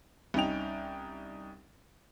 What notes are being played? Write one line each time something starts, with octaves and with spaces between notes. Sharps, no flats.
C2 C#4 D#4 G5 F7